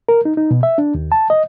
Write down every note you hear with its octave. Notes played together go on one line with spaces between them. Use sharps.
A#4
D#4
D#4
B2
E5
D4
D#2
A5
D#5